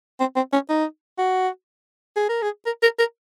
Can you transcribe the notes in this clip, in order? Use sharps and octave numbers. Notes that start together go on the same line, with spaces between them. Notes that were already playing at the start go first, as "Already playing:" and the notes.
C4
C4
C#4
D#4
F#4
G#4
A#4
G#4
A#4
A#4
A#4